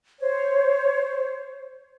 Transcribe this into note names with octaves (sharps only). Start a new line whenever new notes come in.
C5 C#5